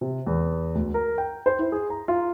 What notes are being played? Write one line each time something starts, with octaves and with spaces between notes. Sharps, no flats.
C3
E2
D2
A#4
G5
C5
E4
G#4
A#5
F4